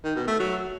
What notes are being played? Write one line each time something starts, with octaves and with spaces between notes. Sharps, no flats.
D#3
B2
A3
F#3